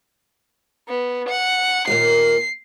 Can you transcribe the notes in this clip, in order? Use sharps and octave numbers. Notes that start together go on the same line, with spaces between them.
B3
F#5
D#2 A#2 A#3 C7